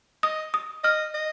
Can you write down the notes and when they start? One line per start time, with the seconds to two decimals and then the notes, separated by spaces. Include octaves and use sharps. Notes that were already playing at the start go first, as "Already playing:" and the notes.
0.23 D#5 D#6
0.54 D#6
0.84 D#5 F6
1.15 D#5